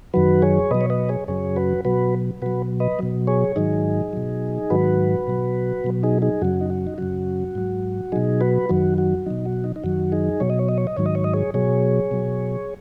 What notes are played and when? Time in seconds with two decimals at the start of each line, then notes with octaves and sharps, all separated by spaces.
0.14 F#2 D#3 F#3 F#4 B4
0.42 G#4 C#5
0.71 B2 F#3 B4 D#5
0.81 C#5
0.90 B4 D#5
1.09 G#4 C#5
1.28 F#2 C#3 F#3 G#4 C#5
1.56 F#4 B4
1.85 B2 F#3 F#4 B4
2.42 B2 F#3 F#4 B4
2.80 B4 D#5
2.99 B2 F#3
3.27 G#4 C#5
3.56 G#2 D#3 F#3 D#4 G#4
4.13 B2 F#3
4.70 G#2 D#3 F#3 F#4 B4
5.27 B2 F#3
5.84 B2 F#3
6.03 D#4 G#4
6.22 D#4 G#4
6.42 F#2 C#3 F#3 F#4
6.61 D#4
6.70 F#4
6.87 D#4
6.98 F#2 C#3 F#3 F#4
7.55 G#2 F#3
8.12 B2 F#3 D#4 G#4
8.41 F#4 B4
8.69 F#2 D#3 F#3 F#4
8.98 F#4
9.26 B2 F#3 D#4
9.45 F#4
9.64 D#4
9.76 D#4
9.84 F#2 D#3 F#3 F#4
10.12 D#4 G#4
10.40 B2 F#3 C#5
10.50 D#5
10.59 C#5
10.68 D#5
10.78 C#5
10.87 D#5
10.97 G#2 D#3 F#3 C#5
11.06 D#5
11.15 C#5
11.24 D#5
11.33 G#4 C#5
11.54 B2 F#3 G#4 C#5
12.11 B2 F#3